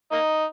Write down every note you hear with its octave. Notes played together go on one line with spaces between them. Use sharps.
A#3 D#4